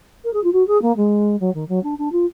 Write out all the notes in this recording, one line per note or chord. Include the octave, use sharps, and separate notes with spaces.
A#4
G#4
F4
F#4
G#4
A#3
G#3
F#3
D#3
F#3
D4
D4
F4